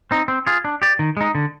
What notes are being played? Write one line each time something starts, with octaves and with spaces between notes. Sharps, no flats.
C4 D#4
C4
F4 G#4
D4
G4 D5
D#3
G#3 D#4
D3